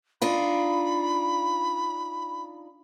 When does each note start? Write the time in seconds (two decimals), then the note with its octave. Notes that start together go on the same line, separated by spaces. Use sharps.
0.22 D4 D#4 F4 B5